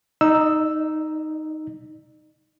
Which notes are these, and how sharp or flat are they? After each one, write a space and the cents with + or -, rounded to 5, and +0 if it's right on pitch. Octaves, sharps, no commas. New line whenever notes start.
D#4 +0 D5 +45 E6 +0